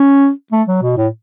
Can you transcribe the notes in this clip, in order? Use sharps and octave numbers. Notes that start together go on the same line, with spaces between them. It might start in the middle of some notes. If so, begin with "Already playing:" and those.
Already playing: C#4
A3
F#3
B2
A2